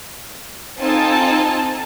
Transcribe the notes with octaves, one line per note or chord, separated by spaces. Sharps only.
C4 D#4 F4 A4 G#5 A5